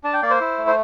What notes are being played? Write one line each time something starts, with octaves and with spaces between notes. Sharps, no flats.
D4 A5
G5
A#3 D5
C5
E4
A3
C5